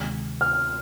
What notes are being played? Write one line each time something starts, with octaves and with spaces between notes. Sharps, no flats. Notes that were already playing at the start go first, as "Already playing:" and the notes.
Already playing: D2 C3 D#3 G#3
F6